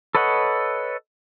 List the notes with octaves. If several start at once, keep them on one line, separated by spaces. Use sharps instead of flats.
A4 B4 C#5 D#5 F#5